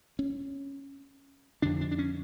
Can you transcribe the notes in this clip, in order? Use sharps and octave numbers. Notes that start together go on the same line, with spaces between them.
C#4
F2 D3 D4
D4
D4
C#4